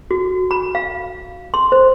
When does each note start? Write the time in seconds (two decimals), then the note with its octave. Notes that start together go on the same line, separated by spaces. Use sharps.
0.11 F#4
0.51 B5
0.75 F5
1.54 C6
1.72 C5